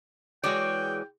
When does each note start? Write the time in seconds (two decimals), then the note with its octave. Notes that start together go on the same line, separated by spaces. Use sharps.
0.44 E3 G#3 F#4 G#4 C#5 D5 G5